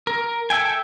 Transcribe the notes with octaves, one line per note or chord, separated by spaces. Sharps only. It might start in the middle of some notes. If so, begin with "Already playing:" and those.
A#4
A4 E5 G5 G#5